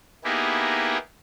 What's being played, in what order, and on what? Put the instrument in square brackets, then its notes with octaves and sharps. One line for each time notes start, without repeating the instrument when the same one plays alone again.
[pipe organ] A#3 B3 D#4 E4 G4 G#4